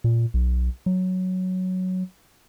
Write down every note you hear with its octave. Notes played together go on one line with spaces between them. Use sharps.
A#2
B1
F#3